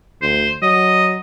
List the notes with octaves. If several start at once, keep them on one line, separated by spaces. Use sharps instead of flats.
D2 C5
F#3 D#5